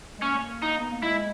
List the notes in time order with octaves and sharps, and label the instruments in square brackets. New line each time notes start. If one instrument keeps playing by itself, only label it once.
[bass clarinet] G#3
[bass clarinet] A#3 [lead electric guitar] C#4
[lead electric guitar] D#4
[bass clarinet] B3
A#3
[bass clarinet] G#3 [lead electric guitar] E4